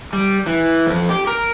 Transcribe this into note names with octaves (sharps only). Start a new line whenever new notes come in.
G3
E3
F2
G4
A#4